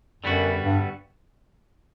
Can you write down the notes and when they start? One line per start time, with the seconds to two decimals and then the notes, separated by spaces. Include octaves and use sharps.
0.23 F#2 D3 G3 B3 F#4
0.64 G2